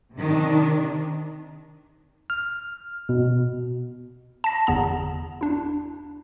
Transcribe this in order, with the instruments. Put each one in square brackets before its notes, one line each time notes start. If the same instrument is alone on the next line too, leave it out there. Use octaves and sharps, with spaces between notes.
[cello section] C3 D#3 D4
[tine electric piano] F6
B2
[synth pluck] A5 A#6
G1 E2 B3 A#5
D4 E4